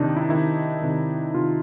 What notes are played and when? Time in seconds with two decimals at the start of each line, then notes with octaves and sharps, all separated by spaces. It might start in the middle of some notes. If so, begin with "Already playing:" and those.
Already playing: C3 D#3 D4 D#4
0.16 E4
0.29 C3 D#3 E4
0.82 C3 D#3
1.34 C3 D#3 F4